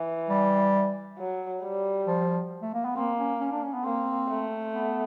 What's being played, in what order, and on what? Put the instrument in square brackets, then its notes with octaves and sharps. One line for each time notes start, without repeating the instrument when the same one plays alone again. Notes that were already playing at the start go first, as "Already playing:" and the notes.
Already playing: [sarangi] E3
[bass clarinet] G3
[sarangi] F#3
G3
[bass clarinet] F3
A3
A#3
B3
[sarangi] A#3 [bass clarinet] C4
[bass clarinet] C#4
C#4
D4
C#4
B3
[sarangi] A#3 [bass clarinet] C4
[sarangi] A3
[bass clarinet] B3